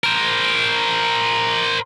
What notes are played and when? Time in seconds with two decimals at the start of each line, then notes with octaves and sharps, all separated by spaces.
0.04 A#4 C5